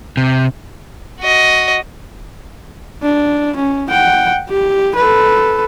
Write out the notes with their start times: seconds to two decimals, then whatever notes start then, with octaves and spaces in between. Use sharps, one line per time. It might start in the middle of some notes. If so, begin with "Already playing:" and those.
0.17 C3
1.20 F#4 D#5
3.02 D4
3.56 C#4
3.89 F#5 G5
4.49 G4
4.96 A4 B4